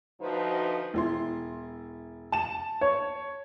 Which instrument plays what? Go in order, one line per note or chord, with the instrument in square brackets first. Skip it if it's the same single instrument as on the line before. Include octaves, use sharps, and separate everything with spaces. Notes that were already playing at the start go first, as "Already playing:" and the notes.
[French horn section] D2 F3 D#4 F#4 B4
[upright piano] E1 E4 C6
A5 E7
[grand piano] C#5